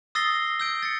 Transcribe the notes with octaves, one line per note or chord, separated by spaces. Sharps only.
D#6 E6 A6 A#6 C7 G7
E6 G6 D7
A6 C#7